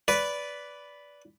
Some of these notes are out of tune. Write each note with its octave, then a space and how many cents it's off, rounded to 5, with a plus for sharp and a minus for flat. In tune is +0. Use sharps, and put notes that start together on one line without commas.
B4 +0 D5 -15